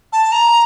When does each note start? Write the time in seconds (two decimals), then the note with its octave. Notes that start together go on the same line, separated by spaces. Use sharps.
0.13 A5
0.32 A#5